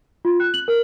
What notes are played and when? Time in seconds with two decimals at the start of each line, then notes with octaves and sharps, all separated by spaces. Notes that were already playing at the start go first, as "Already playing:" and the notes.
0.25 F4
0.40 F#6
0.54 F#7
0.68 A#4